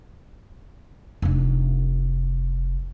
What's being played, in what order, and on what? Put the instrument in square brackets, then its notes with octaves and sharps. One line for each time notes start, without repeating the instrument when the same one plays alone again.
[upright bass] F1 D4